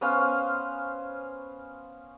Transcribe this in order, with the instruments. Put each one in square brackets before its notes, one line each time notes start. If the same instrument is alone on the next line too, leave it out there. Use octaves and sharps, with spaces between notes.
[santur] B3 C#4 C5 F5